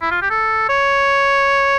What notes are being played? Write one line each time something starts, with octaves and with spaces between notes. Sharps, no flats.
E4
F4
G4
A4
C#5